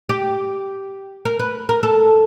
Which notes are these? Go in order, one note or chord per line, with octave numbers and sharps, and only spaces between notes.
G4
A#4
B4
A#4
A4